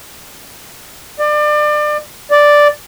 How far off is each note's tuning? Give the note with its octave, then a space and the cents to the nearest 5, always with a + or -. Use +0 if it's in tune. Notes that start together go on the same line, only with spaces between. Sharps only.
D5 +30
D5 +0